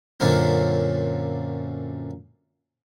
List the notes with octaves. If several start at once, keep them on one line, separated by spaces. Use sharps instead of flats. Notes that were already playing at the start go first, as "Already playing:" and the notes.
F#2 A#2 D3 F#3 C4 F4